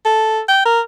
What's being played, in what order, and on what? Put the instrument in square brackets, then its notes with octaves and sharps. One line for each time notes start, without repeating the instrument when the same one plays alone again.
[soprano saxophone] A4
G5
A#4